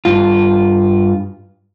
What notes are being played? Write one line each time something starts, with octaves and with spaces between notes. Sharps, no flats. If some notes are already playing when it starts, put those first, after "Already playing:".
G2 F4